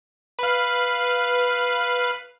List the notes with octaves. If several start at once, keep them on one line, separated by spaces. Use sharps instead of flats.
B4 F5